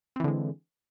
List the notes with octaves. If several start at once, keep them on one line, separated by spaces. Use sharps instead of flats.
D3 E3 G#3 C4